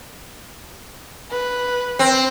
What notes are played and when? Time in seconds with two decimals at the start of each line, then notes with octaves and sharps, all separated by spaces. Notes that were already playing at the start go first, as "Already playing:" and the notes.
1.31 B4
1.99 C4